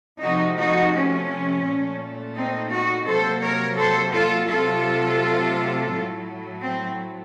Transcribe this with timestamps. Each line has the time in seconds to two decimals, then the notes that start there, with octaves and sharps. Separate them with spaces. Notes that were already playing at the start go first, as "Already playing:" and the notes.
0.20 C3 F3 A3 D#4 F#4
0.56 D#4 F#4
0.92 C#4
1.63 A#2 A3
2.34 C4 D#4
2.70 D#4 F#4
3.06 C3 F#3 A#3 A4 C5
3.41 A#4 C#5
3.77 A4 C5
4.13 F4 A4
4.48 C3 F#3 A3 F4 A4
5.91 A2 F#3 A3
6.62 C4